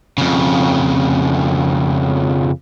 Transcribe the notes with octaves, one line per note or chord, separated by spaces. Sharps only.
F2 C#3